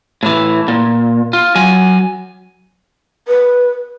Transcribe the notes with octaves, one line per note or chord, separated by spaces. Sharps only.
A2 E3
A#2
F4
F#3 G#5
B4